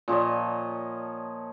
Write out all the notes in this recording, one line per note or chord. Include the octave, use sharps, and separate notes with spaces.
A#2 F3 C#5 D#5